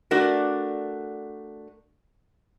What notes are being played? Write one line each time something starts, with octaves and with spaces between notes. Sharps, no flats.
A3 D4 F#4 A#4